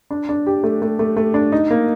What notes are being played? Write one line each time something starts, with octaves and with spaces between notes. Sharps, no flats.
D4
D4
G4
A3
A3
A3
A3
D4
D#4
A#3